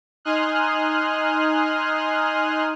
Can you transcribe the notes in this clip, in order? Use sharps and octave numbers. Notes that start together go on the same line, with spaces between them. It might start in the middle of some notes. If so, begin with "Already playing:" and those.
D#4 G#5 C6 D#6 F6 F#6